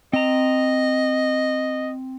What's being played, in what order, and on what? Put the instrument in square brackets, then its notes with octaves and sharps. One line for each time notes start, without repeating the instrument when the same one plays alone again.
[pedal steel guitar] C4 A#5 [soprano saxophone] D#5